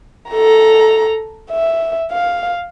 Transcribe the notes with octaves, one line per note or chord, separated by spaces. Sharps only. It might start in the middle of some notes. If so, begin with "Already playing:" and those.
A4 A#5
E5
F5